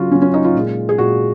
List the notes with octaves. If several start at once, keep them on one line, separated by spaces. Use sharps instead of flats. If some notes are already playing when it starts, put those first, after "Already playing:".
Already playing: C#3 F#3 F4 F#4
C#3 F#3 C#4
C#4
D#4
F4
A#2 G#3
G#4
A#2 G#3 F#4